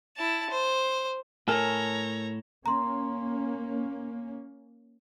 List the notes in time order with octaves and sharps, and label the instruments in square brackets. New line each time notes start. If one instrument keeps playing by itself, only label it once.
[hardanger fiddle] E4 A5
C5
[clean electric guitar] A2 A4 [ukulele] A#4 G#5 [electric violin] C#5 A#5
[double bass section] A#3 C#4 [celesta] A#5 C6